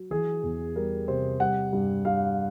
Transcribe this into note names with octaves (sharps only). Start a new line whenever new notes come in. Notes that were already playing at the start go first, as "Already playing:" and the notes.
Already playing: F#3
E3 G#4
E2
G3 A#4
C3 C5
G3 F#5
G2
G2 F5